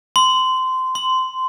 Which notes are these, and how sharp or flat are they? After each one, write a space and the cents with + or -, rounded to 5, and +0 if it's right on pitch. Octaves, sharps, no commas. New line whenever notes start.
C6 -20
C6 -15